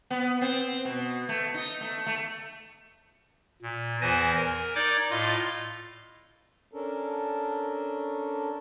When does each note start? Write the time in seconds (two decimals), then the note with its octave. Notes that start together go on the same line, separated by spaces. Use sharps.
0.10 B3
0.41 C4
0.85 B2
1.29 A3
1.54 D#4
1.81 A3
2.06 A3
3.62 A#2
4.01 E2 E3 C5 G#5 A#6
4.36 A#4
4.75 D#4 D5 D6 G6 G#6
5.11 A2 F4 D#5 F5 F6
6.72 C#4 D4 A4 A#4